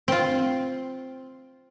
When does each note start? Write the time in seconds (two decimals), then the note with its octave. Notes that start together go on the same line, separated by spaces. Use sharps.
0.08 C4 F4